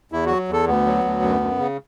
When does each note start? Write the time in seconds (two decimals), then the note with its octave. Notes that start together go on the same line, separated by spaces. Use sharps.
0.12 E2 E4
0.26 F#3 F#4
0.49 E2 A4
0.67 D2 B3
0.86 F#3
1.04 D2
1.22 F#2
1.40 F#2
1.59 C#3